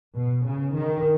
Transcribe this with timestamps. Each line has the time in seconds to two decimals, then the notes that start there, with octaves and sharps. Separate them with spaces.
0.15 B2
0.45 C#3
0.74 D#3